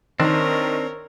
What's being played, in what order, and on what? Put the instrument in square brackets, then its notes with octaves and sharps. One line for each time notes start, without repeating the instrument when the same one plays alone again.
[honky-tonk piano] D#3 [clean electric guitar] C4 D4 [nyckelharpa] A#4 C#5